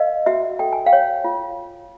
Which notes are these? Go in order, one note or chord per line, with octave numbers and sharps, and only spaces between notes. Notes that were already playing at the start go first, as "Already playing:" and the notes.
Already playing: A#4 D#5 F5
F#4 E5 F#5
A4 G5
G#5
F5 G5
C#5
F4